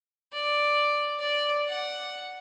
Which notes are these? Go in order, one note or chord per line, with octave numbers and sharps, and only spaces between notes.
D5
D5
F#5